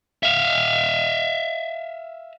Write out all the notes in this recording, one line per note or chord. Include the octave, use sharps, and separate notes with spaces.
E5 F5